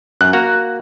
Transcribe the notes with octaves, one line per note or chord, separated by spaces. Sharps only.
F#2 F#6
A#3 F#4 A#5